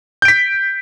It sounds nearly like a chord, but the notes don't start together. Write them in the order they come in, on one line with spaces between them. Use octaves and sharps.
G6 D7 B6